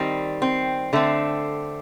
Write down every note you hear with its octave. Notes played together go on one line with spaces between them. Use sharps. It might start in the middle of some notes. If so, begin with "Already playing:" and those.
Already playing: D#3 G3 C4
C4
D3 A3 C4